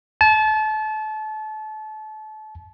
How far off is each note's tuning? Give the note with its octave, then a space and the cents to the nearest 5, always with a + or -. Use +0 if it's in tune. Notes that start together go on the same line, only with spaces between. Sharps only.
A5 -30